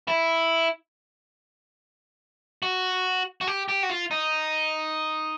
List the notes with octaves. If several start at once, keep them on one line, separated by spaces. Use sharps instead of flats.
E4
F#4
F#4
G4
G4
F#4
F4
D#4